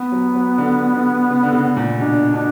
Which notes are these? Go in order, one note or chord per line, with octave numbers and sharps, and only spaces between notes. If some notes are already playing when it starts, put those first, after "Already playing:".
Already playing: B3
F#3
F#3
D3
D3
C#3
D3
C#3
A#2
B2 D4
B2 D4